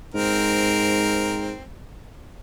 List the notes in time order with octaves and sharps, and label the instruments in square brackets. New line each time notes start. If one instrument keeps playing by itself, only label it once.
[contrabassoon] G#2 [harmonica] C4 A#4